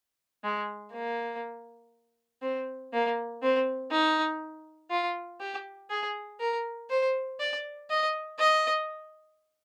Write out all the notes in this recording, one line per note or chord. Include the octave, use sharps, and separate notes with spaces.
G#3
A#3
C4
A#3
C4
D#4
F4
G4
G#4
A#4
C5
D5
D#5
D#5